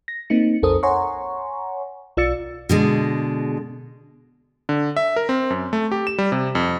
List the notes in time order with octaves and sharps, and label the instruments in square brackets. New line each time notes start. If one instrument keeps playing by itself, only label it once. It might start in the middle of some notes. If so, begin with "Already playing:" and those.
[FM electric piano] A#6
A#3 C4 D#4 C#7
B1 F2 A4 A#4 C5 D#6
C#5 F#5 G#5 A#5 C6 C#6
B1 F4 D5 E6 A6 C#7
[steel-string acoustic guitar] B2 D3 G#3
[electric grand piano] D3
E5
A#4
C4
F#2
A3
G4
E7
G3
C3
F2